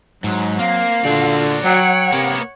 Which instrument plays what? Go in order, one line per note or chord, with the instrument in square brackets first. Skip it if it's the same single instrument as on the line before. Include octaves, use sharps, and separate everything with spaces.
[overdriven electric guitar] G#2 [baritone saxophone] F#3
[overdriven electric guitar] A#3 [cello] C4 [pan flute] F5
[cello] A#2 F4 [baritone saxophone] D3 [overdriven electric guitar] F#4 D5
[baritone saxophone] F#3 [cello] C#5 F#5 [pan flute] G5
[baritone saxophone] C3 [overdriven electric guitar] A#3 B3